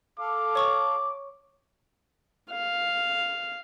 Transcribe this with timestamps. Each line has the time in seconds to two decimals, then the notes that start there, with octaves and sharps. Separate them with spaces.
0.19 A4 F5 D6
0.55 C#5 C#6 D#6
2.51 F5